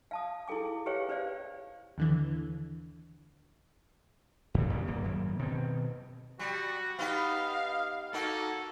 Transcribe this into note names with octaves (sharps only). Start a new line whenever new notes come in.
F5 A5 D#6
E4 G#4 A4 G5 D6
G4 B4 C#5 F5 G5
C#4 B4 C5 D5 F5
D#2 D3 E3
E2 A2
D#2 A#2 C#3 G3
D#1 G2 A#3
G#1 F#2
B2 D#3 C4
G3 F#4
B3 D#4 G4 F5
A#3 D#4 F#4 A4